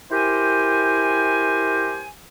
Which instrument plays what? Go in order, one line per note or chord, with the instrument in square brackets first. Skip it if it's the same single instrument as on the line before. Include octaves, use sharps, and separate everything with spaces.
[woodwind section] E4 G4 A#4 C5 G5 G#5